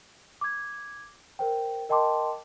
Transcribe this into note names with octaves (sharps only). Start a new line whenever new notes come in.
D6 G#6
A#4 C5 G5
A#4 D#5 G5 A5 C6 D6